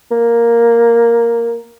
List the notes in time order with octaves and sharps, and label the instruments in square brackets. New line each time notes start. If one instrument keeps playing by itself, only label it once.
[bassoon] A#3